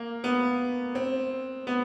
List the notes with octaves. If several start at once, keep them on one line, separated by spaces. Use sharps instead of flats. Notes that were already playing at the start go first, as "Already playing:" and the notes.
Already playing: A#3
B3
C4
B3